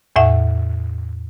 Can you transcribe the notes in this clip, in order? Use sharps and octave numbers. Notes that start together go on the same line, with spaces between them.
E2 A2 E5 F#5